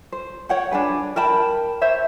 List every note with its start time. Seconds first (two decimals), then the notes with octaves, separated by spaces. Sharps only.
0.12 C5
0.49 C#5 F#5 G5
0.71 D4 D#4 G#4 B4
1.16 A#4 G5 A5 B5
1.82 C5 C#5 E5